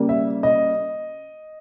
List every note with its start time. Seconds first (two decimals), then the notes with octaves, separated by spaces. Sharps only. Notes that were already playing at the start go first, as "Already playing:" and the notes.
Already playing: C#3 G3 A#3
0.09 E5
0.43 D#5